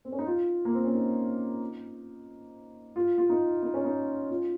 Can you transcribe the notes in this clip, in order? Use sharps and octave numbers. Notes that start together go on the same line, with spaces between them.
C4
C#4
D#4
F4
A#3
C4
C#4
D#4
F4
F4
D#4
D#4
C#4
D#4
F4